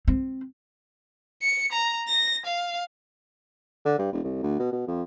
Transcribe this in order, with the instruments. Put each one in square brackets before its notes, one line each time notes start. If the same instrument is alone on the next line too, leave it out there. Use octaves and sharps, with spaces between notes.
[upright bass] C4
[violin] C#7
A#5
A#6
F5
[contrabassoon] D3
G2
E1
C2
D2
B2
B2
F2